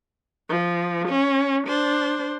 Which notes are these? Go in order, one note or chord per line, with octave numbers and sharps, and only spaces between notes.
F3
C#4
D4 C5